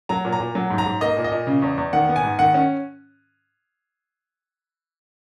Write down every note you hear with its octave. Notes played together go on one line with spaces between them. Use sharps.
F#3 A#5
A#2
A#5
A#2
F#3
G#2
A#5
G#2
A#3 D#5
A#2
D#5
A#2
C#3
E2
E2
D#3 F#5
B3
G#5
G#2
D#3 F#5
C#4